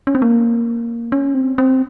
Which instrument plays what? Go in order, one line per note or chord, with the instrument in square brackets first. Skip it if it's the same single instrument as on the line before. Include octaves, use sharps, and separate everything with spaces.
[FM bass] C#4
C4
A#3
C#4
C4
C4